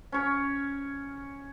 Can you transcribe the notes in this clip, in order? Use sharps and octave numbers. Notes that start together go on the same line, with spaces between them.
C#4 C#5